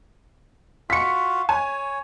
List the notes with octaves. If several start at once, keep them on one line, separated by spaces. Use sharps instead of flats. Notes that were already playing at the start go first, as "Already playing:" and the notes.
F4 F#4 F5 B6 C#7
C#5 G#5